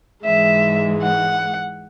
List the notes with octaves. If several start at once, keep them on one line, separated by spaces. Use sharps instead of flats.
G#2 E3 G#3 E5
F#5